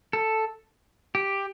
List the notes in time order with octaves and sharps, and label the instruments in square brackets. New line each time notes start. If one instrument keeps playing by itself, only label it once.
[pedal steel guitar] A4
G4